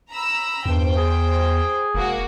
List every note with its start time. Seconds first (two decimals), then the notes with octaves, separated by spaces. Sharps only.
0.11 A#5 B5 E6
0.66 E2 G2 C5 G5
0.96 G#4
1.95 E1 A#3 F#4